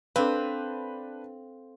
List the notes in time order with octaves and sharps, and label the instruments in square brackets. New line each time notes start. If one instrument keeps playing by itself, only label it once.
[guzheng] C4 [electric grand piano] D4 B4 [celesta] A4 F5